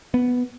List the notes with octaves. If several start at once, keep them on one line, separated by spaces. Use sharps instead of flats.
B3